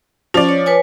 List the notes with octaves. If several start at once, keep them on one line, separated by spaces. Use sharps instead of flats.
F3 C#4 D5
C#5
B4 C#5 G#5